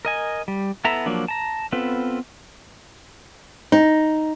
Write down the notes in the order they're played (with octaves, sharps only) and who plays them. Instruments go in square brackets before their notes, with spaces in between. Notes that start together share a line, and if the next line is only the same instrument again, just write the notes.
[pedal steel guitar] A#4 D#5 G#5
G3
B3 E4 A4 E5 A#5
F3 F#3 A#3 D4
A5 A#5
B3 C4 F4 A4 B4
[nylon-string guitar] D#4